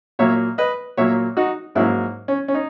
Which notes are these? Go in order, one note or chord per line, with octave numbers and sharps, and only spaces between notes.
A#2 F#3 A#3 C#5 E5
B4 D#5
A#2 F#3 A#3 C#5 E5
D#4 F#4
G#2 F#3 A#3 C#4 E4
C#4
C#4
D#4